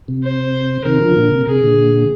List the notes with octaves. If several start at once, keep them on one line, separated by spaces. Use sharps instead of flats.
C3
C5
C3 D#3 A#4
D3 F3
A#2 D3
C3
C3 G#4
A#2 D3